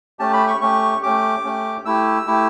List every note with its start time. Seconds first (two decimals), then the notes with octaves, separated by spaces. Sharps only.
0.19 A3 C#4 G4 A5
0.33 B5
0.48 C#6
0.61 A3 C#4 G4 C#6
1.03 A3 C#4 G4 D6
1.44 A3 C#4 G4
1.85 A3 E4 G4 E6
2.27 A3 E4 G4